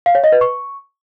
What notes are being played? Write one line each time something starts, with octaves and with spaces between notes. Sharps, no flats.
F5
C#5
D#5
B4
C#6